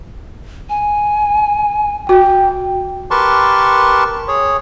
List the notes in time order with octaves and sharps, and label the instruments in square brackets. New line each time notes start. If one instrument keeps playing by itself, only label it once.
[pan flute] G#5
[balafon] F#4 [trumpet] G5
[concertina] G4 A#4 B4 A5 C6 C#6
G#4 C#5